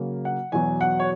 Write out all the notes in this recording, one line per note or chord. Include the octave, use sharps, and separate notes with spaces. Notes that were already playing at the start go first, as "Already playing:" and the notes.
Already playing: C#3 F#3 A#3
F#5
E2 B2 F#3 G#5
F#5
C#5